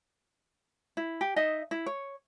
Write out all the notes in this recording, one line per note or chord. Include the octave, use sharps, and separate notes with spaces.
E4
G4
D#4 D#5 E5
E4
C#5